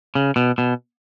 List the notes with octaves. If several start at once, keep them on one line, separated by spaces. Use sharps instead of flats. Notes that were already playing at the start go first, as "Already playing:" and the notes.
C#3
B2
B2